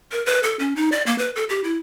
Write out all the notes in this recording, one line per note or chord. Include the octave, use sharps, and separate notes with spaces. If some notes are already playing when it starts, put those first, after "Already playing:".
A#4
B4
A4
C#4
D#4
D5
A#3
B4
A4
G4
E4